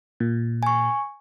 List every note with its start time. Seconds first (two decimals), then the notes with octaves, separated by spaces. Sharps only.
0.20 A#2
0.63 G#5 C#6